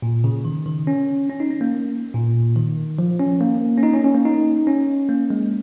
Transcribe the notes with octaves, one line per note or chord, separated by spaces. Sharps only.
A#2
C#3
D#3
D#3
C#4
C#4
D#4
C#4
A#3
A#2
D#3
F3
C#4
A#3
C#4
D#4
C#4
C#4
A#3
D#4
C#4
A#3
G#3